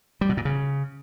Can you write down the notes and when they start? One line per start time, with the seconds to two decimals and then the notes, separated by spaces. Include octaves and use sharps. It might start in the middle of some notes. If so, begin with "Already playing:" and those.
0.21 G3
0.29 B2
0.37 A#2
0.45 C#3